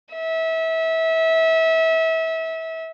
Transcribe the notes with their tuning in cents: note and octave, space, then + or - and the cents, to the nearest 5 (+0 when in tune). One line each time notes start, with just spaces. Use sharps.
E5 -25